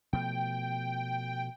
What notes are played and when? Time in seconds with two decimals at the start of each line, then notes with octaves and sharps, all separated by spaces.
0.13 B2 F3 A3 G5